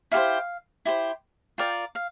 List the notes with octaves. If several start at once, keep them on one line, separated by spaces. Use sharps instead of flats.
E4 G4 C5 F5
E4 G4 C5
F4 A#4 D5 G5
F5